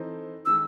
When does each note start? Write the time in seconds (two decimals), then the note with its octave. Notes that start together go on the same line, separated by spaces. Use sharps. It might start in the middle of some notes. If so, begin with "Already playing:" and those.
Already playing: E3 C4 D#4 A4 C5
0.45 D#3 G#3 E6